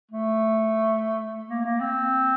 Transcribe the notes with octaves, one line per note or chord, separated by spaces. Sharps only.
A3
A#3
A#3
C4